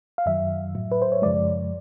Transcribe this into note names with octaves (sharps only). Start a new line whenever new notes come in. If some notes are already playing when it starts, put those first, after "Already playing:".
F5
F#2 D#3 F#3 E5
A2 F#3
B4
C5
C#5
F#2 C#3 F3 G#3 D5